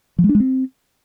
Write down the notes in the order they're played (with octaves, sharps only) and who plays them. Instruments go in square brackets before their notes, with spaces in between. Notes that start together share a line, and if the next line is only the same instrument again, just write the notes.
[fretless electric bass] F3
G#3
D4
G#3
C4